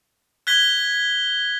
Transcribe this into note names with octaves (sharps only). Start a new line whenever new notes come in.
F#6 G#6 B6 G7